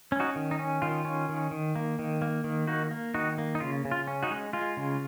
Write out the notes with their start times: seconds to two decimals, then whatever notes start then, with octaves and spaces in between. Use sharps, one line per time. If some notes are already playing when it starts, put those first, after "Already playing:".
0.12 C#4
0.20 D#4 F#4
0.36 D#3
0.51 D#4
0.59 C#4
0.82 D#3 F4
1.05 C#4
1.29 D#3
1.51 D#3
1.76 A#3
1.99 D#3
2.22 A#3
2.44 D#3
2.67 A#3 D#4 F#4
2.91 A#3
3.14 D#3 D#4 F#4
3.38 A#3
3.55 D#4
3.60 C#3 F4
3.85 C#3
3.92 F4
4.07 C#4
4.23 D#4 F#4
4.31 G#3
4.53 G#3 F4
4.77 C#3